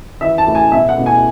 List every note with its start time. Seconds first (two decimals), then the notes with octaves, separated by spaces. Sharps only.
0.21 E3 E5
0.38 A5
0.47 A2
0.55 G#5
0.72 B2 E5
0.89 F#5
0.97 B2
1.06 G#5